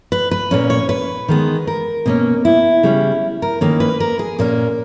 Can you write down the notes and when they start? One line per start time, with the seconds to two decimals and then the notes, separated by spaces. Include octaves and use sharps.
0.12 B4
0.31 B4
0.51 A#2 A#3 C#4
0.70 C#5
0.89 B4
1.28 D#3 G#3 B3
1.67 A#4
2.06 B2 A#3 C#4
2.45 E4
2.83 C#3 G3 C#4
3.42 A#4
3.61 D#3 A#3 C#4 B4
3.80 B4
4.00 A#4
4.19 G#4
4.39 A#2 A#3 C#4 A#4